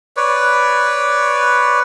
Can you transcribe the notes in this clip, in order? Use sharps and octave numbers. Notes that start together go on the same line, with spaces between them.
B4 C#5 D5